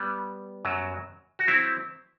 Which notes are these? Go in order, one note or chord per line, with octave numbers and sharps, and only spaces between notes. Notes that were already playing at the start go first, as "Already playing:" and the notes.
Already playing: G3 B3
F#2 F#3
F#4
F#3 C4 E4